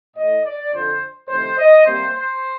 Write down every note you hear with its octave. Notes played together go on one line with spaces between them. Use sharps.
A2 A3 D#5
D5
F2 D3 F3 C5
F2 C3 D#3 A3 C5
D#5
C3 G3 A#3 C5
C5